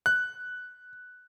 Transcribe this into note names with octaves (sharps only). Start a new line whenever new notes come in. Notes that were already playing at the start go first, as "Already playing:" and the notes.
F#6